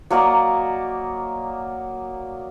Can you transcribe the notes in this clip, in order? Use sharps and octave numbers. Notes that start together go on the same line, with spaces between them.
F#3 A#3 D5 D#5